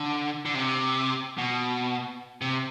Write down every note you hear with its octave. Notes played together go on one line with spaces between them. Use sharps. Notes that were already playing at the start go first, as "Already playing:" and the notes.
Already playing: D3
D3
C3
B2
C3